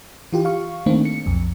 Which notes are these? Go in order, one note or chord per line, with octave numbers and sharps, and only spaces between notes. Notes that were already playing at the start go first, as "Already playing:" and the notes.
E3 F4 G4
F5 C#6
D#3 A3 A#3 C4 D4
C#7
B1 F2